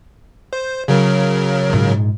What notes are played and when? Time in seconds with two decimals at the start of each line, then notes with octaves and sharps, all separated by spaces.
0.53 C5
0.88 C#3 F#3 A#4
1.70 A#1 G#2